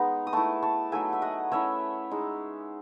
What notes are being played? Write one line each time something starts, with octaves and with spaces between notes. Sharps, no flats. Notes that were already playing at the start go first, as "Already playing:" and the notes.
Already playing: G#3 B3 D#4
D#6
A3 E4 A5 C#6
A5 C#6
F#3 A3 D#4 E5 G#5
E5
D#5 F#5
A3 C#4 E4 C#5 E5
G#3 D#4